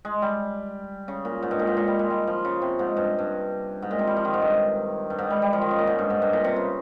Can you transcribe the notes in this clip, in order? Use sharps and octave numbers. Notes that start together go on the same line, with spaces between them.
G#3
G3
C#3
A#2
G#2
G2
A#2
G#2
A#2
G3
G#3
G3
F3
C#3
C3
G#2
G2
G2
G#2
A#2
C3
G3
F3
D#3
G#2
G2
G2
G#2
G3
G3
F3
D#3
C#3
A#2
G#2
G2
G#2
G2
A#2
C3
C#3